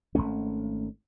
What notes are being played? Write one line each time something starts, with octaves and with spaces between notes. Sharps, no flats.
G#1 F#2 A3 C#4